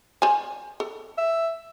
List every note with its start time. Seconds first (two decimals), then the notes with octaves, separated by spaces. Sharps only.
0.22 C5 D5 G#5
0.80 A4
1.17 E5